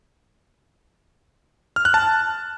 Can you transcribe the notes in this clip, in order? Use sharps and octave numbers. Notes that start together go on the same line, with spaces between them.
F6
F#6
A5